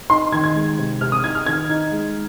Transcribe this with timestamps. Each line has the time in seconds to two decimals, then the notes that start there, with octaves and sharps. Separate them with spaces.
0.10 D#4 C6
0.32 D#3 G#6
0.44 G#6
0.55 G#3
0.78 C3
1.01 C3 F6
1.12 D#6
1.24 D#4 G#6
1.35 F6
1.46 D#3 G#6
1.69 D#4
1.92 G#3